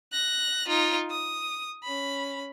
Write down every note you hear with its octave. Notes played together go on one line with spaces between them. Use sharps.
F#6 A#6
D#4 F4
D#6
C#4 B5